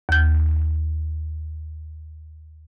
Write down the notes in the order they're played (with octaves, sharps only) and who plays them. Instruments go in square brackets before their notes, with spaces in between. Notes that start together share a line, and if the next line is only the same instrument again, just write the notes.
[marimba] D#2 G6